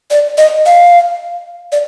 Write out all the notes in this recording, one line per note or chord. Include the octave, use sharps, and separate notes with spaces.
D5
D#5
F5
D5